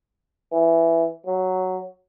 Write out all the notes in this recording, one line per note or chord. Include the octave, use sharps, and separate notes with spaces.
E3
F#3